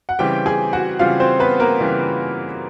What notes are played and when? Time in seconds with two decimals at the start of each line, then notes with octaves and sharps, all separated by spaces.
0.09 F#5
0.19 C#3 E3 G3 C4 G4 G5
0.46 G#4 G#5
0.73 F#4 F#5
0.99 C#3 E3 G3 C4 F4 F5
1.20 C4 C5
1.39 B3 B4
1.60 A#3 A#4
1.81 C#3 E3 G3 C4